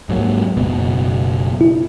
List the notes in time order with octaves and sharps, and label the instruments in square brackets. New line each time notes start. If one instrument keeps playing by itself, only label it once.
[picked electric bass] G#2 F#3 A#3
F#1 B2 B3
[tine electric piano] E4